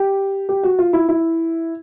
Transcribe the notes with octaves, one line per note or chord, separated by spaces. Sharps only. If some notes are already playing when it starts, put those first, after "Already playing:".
Already playing: G4
G4
F#4
F4
E4
E4